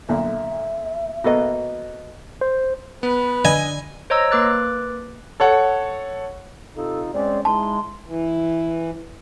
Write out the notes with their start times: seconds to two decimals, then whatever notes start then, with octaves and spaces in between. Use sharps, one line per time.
0.09 B1 A#2 D3 E5
1.24 B2 A#3 B3 F#4 A4 D#5
2.41 C5
3.03 B3 B4
3.45 D3 D#5 G#5
4.10 C5 C#5 D#5 A#5 E6
4.31 A#3 B4 D6 F#6 A6
5.40 A4 C#5 F#5
6.76 C3 D#4 F4 A4
7.14 G#3 C4 C#4 D5
7.45 G#3 D#4 E4 A5 C6
8.06 E3